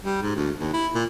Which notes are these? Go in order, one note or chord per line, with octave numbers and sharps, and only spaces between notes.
G3
G#2
D2
D#2
E4
A#2